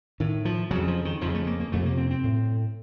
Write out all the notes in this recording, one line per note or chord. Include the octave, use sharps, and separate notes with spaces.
A2 D#3
F3
F2 C#3 F#3
F3
D#3
F2 C#3 F3
A3
A#3
A#3
F2 C3 A3
A#3
C4
C4
A2